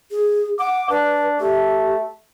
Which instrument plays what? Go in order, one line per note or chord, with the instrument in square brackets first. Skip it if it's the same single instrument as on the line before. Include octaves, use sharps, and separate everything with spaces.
[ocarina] G#4
[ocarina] F#5 [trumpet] D6
[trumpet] D4 [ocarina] B4
[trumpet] A3 [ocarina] G4